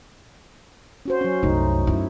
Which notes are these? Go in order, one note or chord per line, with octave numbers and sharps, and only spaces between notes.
C#4 F#4 C5
F#3 C#4
C2 F#2 A3 D#4
F#2 E4